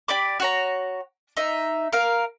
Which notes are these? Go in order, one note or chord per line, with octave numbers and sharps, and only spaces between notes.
G4 D5 B5 D6
F#4 C#5 A#5
D#4 E5
A#4 F5